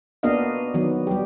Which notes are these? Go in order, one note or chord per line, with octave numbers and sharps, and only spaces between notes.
A#3 B3 D4 F#4 D#5 F5
D#3 F#3 B3
G3 G4